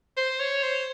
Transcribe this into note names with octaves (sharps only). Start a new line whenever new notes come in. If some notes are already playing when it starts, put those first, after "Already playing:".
C5
C#5
C5